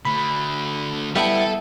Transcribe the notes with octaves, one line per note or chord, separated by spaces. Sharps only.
D3 A3 B5
G3 B3 E4 A4 E5 G5 A5 B5